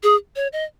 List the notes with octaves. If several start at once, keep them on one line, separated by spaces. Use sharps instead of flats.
G#4
C#5
D#5